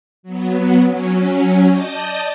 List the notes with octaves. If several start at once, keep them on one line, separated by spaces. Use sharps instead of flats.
F#3 B3
F#3 C#4
D5 D#5 A5 D#6 G6